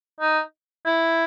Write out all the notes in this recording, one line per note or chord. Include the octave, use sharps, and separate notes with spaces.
D#4
E4